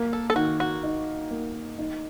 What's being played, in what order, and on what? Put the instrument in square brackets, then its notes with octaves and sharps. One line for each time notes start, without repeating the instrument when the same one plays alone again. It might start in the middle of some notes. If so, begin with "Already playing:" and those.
Already playing: [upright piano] A#3
[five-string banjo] A4
A4
[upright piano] D#3 [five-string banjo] F#4
[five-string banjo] F#4
[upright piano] D#4
A#3
D#4